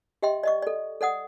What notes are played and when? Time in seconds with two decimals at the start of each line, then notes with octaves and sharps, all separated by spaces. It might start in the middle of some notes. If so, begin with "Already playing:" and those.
0.22 G4 D#5 E5 G5 C6
0.43 D5 D#5 C#6
0.62 A4 D5
1.01 A4 D5 F#5 D#6